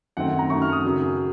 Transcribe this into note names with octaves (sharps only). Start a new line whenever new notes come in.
F#2 D#3 A3 C4 F#5
F#5
A#5
F#2 D#3 A3 C4 C#6
F6
D#6
F#2 C#3 F#3